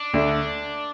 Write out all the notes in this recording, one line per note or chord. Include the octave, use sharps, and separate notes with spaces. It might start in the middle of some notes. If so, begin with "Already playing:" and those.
Already playing: D4
D2 D3